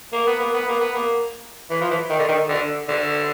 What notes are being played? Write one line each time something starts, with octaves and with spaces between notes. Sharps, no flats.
A#3
B3
A#3
B3
A#3
B3
A#3
E3
F3
E3
D#3
D3
D#3
D3
D3